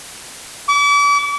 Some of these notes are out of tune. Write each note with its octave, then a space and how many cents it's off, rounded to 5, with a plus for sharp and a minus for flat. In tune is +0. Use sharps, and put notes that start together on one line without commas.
D6 -40